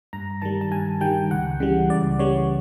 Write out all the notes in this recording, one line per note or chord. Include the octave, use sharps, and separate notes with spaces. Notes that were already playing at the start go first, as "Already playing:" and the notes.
G2 A#5
D#3 G3 A5
A5
G2 G#5
D#3 G3 G5
C#2 F#5
C#3 E3 G3
C#2 D5
C#3 E3 G3 C#5